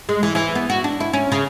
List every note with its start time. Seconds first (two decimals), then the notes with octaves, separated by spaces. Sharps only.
0.09 G#3
0.23 E3
0.35 E3
0.55 B3
0.70 F#4
0.84 D4
1.00 E4
1.13 C#4
1.32 C#3